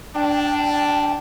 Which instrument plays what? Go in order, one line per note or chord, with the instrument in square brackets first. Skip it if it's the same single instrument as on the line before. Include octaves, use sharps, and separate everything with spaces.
[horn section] D4 [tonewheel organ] G5